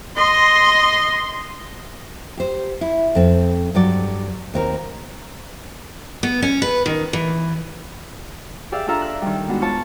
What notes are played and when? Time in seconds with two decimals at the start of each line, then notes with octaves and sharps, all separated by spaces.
0.18 D#5 C6
2.37 G4 C5
2.81 E4
3.15 F2 C4
3.74 G2 F#3 D5
4.54 D#2 C4 A#4
6.23 B3
6.42 C#4
6.62 B4
6.86 D#3
7.13 E3
8.72 G4 G#4 D5 E5 F5
8.87 D4 F4 A4 E5 F5 A#5
9.02 F#6
9.22 D#3 G3
9.48 G#3 B3 D4 F#4
9.61 F4 C#5 A5